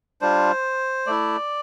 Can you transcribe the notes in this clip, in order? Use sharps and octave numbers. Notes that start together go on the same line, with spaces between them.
G3 D4 F4 C5
A3 E4 D5